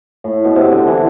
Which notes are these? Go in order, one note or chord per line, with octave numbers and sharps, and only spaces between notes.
A2
B2
C3
D3
E3